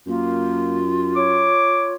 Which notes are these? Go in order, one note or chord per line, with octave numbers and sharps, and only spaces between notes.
F#2 A#3 F4
C#5 D6